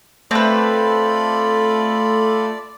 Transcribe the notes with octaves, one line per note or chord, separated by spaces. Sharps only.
A3 C4 F4 B4 D5 B5